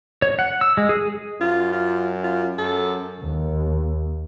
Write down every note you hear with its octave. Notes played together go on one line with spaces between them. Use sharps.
C#5
F#5
E6
G#3
G#4
F#2 F4
F4
F4
F#2 A4
D#2